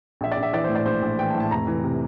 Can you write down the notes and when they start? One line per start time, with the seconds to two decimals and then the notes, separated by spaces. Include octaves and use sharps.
0.21 A#1 E5
0.32 D5
0.37 A#1
0.43 E5
0.53 E3 D5
0.64 C5
0.69 A2
0.75 D5
0.85 A#1 C5
1.02 A#1
1.19 E3 G5
1.30 A5
1.34 A2
1.40 A5
1.51 F1 A#5
1.67 E3
1.84 C3